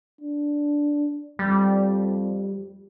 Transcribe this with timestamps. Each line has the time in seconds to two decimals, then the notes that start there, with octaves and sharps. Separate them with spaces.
0.21 D4
1.39 F2 G3